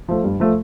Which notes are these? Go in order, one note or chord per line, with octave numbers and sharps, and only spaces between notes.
F3 A3
G2
F3 A3